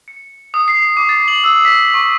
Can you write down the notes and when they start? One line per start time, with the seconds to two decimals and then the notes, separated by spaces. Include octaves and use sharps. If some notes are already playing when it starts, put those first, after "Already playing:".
0.08 C#7
0.54 D#6
0.68 C7
0.97 D6
1.09 A6
1.28 F#7
1.44 E6
1.65 B6
1.94 C#6